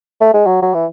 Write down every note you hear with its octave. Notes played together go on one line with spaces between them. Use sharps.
A3
G#3
F#3
F#3
E3